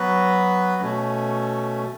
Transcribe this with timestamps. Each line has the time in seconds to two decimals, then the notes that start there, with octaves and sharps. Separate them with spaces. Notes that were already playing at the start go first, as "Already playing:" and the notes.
Already playing: F#3 B3 F#4 B4
0.82 B2 A3 C#4